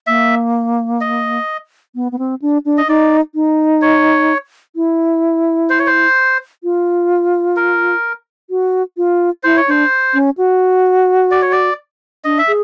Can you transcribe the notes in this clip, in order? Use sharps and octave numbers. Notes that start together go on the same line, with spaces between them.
A#3 E5
D#5
B3
B3
C4
D4
D4
D#5
D#4 D5
D#4
C#5
E4
C5
C#5
C5
F4
A#4
F#4
F4
E4 C5
C#5
D4 C5
C#4
F#4
D5
C#5
D5
D4 D#5
E5
G#4